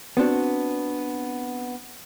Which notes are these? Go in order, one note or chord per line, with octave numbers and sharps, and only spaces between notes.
B3 C4 D4 F#4